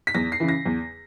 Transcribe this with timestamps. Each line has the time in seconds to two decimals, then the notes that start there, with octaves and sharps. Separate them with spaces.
0.07 B6
0.14 E2 A#6
0.32 C7
0.40 C#3 E3
0.48 A#6
0.66 E2